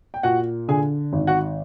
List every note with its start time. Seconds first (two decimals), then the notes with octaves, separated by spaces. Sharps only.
0.14 G5
0.23 A#2 F#4 F#5
0.68 D3 G#4 G#5
1.13 G#1
1.27 F#4 F#5